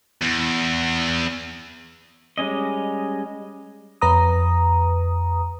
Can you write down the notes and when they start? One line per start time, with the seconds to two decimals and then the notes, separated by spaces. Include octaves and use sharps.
0.22 E2
2.38 G3 G#3 C#4 D#5
4.01 F2 B4 A#5 D#6